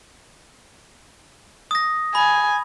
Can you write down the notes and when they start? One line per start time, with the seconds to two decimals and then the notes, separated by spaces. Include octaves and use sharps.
1.71 D#6 A#6
2.15 G#5 B5